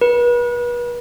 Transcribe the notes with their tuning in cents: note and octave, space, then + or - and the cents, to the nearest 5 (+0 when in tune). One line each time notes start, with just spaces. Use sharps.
B4 -35